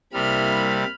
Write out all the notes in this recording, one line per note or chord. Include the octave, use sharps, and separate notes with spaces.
C2 C3 G3 A#3 E4 B5 F6